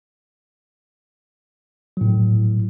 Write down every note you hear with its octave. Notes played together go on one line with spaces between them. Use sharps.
A2 F#3